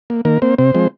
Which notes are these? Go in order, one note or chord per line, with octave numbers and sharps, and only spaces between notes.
A#3
D#3 A#3 A#4
A#3 C4 C5
C3 C4 C5
F3 G#3 C4